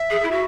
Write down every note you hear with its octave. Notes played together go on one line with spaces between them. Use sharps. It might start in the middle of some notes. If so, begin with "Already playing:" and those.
Already playing: E5
G#4
E4
F#4